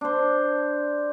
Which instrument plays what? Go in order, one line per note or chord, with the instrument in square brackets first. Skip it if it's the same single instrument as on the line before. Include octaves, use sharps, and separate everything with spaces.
[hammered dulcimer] D4 C5